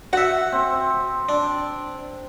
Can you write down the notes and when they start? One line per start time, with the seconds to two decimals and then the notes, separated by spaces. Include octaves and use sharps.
0.13 F#4 E5 F#5
0.52 C4
1.29 D4